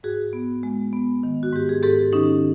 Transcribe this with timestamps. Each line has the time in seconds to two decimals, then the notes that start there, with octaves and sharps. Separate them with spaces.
0.03 G#2 F#4 G#4
0.33 B3
0.63 G#3
0.93 B3
1.23 D#3
1.43 F#4
1.53 G#2 G4
1.69 G#4
1.83 G#2 G4 A4
2.13 D#3 C#4 D#4